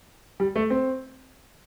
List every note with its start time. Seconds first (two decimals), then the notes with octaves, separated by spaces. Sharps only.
0.40 G3
0.56 A3
0.70 C4